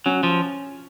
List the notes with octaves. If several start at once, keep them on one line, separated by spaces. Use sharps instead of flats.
F#3 C#4
F3